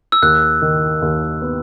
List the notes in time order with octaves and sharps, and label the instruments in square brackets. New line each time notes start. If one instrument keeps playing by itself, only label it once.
[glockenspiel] E6
[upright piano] D#2 [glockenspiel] F#6
[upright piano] D#3
D#2
B3